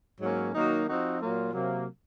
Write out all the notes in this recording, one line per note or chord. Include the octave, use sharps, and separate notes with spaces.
G#2 F#3 A#3 C#4
D#3 F#3 A#3 D#4 F#4
F3 C4 D#4 F#4
A#2 F#3 A#3 F4
C3 F#3 A#3